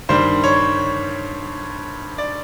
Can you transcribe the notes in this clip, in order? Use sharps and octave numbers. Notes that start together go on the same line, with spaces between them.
G2 D#3 G3 C5
C#5
D5